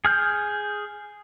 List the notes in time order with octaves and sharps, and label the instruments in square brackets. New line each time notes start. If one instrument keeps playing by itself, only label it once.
[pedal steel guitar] G#4 F6 G6